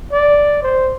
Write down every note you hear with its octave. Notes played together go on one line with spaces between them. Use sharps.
D5
C5